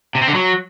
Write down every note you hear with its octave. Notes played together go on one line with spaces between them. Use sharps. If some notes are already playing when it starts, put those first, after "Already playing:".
C3
C4
D3
F#3